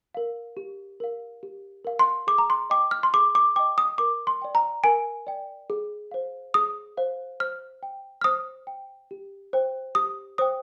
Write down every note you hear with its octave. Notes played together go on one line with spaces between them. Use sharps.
A#4 F5
G4
A#4 F5
G4
A#4 F5
C6
G#4 D6
A#5
C6
D#5 G5 D6
F6
C6
G#4 D6
D6
D#5 G5 D6
D#6
A#4 D6
C6
D5 G5
A#5
A#4 G#5
D5 G5
G#4
C5 F5
G#4 D#6
C5 F5
C5 F6
G5
F6
C5 D#6
G5
G4
C5 G5
G4 D#6
C5 G5 D#6